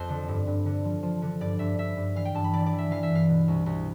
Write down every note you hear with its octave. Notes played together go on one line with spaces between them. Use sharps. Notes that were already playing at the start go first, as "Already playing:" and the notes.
Already playing: F2 C5
D3
G2
G2
D3
F3
F3
D3
G2 D5
G2 E5
G2 E5
G2
E3 F5
G5
G2 A5
B5
E3 D5
D5
E3
E5
E3 F5
E5
G2 F5
B2
C2
C2